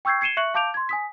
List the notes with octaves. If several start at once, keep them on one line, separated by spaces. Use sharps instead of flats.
G5 C#6 E6 G6 G#6 C7
G#6 C7 C#7 D#7 E7 G7
E5 C#6 F#6 C#7 F#7
F5 A5 D6 G6 D7 F7
C6 G#6
G#5 D#6 B6